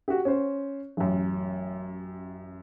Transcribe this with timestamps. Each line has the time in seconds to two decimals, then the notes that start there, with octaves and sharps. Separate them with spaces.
0.08 F#4 G4
0.25 C#4 C5
0.97 A1 F#2